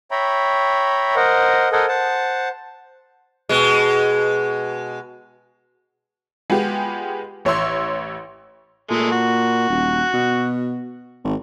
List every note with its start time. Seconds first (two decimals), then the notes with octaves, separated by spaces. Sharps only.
0.11 C#5 E5 G5 A#5 B5
1.16 A#4 C5 D#5 F#5
1.72 A4 A#4 C5 D#5 F#5 G#5
1.88 C5 F#5 A5
3.49 B2 G#3
6.50 G#3 B3 F4 G4
7.45 A1 C#5 E5 C6 E6
8.91 A#2 G#3 A3
9.11 F#4
9.70 D#1
10.14 B2
11.25 G#1